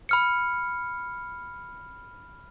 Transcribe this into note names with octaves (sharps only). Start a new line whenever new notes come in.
B5 F6 C#7